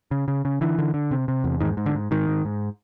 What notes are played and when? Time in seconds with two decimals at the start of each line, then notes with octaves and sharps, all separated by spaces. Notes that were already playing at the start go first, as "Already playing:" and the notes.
0.11 C#3
0.28 C#3
0.45 C#3
0.61 D3 E3
0.78 D3
0.94 D3
1.11 C3
1.28 C3
1.44 E2
1.61 G#2 D#3
1.77 G#2
1.86 D3
1.95 G#2
2.11 G#2 D#3
2.28 G#2
2.45 G#2